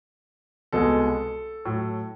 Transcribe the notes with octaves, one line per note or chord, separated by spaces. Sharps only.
C2 B2 G#3 A4
A2 F#3